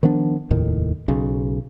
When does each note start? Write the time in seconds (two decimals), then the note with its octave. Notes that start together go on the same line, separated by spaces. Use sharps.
0.03 D#3 F3 B3 D4
0.51 F1 D#2 A2 D#3
1.08 B1 C#3